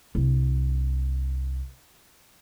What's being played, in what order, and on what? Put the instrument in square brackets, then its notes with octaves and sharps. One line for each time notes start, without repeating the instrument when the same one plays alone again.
[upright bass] C2 D3